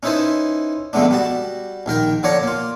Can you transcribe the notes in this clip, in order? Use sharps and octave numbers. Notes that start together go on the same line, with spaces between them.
C#4 D#4 E4 B4 C5 A5
F2 D3 G#3 A3 B3 D4
G3 F#4 A5
A#1 D#3 A#4 G5
D3 F3 C#5 D5 F#5 A#5
A#3 F4